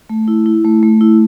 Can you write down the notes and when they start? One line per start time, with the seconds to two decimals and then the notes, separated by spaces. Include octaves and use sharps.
0.10 A3
0.28 E4
0.46 E4
0.65 A3
0.83 A3
1.01 E4